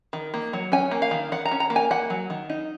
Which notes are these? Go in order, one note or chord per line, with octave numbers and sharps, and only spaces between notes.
D#3
A#3
F#3
C#4 G#5
A#3
F5
D#3
D#3 F#5
A#5
C#4
A#5
A#3
G#5
A#3 F#5
F#3
D#3
D#4